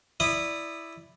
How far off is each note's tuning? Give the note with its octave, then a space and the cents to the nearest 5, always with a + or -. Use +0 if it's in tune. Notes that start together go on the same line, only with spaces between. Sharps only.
E4 +0 D5 +0 D#6 -20